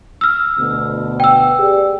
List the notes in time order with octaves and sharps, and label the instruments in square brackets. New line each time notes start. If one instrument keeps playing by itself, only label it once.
[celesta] E6 F6
[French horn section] D2 B2
[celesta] G5 E6
[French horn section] G4 G#4 D5